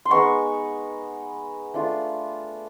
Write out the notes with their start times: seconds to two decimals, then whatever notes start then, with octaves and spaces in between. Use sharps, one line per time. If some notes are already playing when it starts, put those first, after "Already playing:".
0.05 C6
0.11 G#3 B3 D#4 C#6
1.74 A3 D4 F4